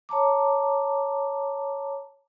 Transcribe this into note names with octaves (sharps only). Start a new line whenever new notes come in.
C#5 A5 A#5 D6